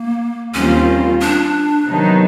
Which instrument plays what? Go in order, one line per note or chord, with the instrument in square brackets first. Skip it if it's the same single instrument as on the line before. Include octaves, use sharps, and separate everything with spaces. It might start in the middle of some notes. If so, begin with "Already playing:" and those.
Already playing: [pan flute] A#3
[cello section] D#2 D#3 G3 C4 F4 [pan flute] C#4
[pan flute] D4
[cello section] C3 D#3 F#3 B3 D#4